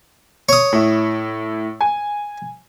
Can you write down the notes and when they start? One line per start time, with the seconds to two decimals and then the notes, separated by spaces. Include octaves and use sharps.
0.49 C#5 D#6
0.73 A2 E4
1.81 G#5